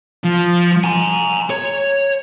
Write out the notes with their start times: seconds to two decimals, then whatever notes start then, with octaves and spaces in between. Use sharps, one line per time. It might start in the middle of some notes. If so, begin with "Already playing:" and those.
0.24 F3
0.84 G#5 A#5
1.50 C#5